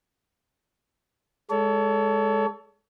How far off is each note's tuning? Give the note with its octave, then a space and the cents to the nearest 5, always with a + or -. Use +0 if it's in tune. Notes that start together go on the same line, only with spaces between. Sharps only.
G#3 +0 A4 +0 C#5 +35